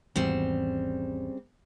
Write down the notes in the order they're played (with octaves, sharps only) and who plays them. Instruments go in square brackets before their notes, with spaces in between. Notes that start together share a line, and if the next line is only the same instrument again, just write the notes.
[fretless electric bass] G#1 E2 [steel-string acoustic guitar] C#3 G3 C4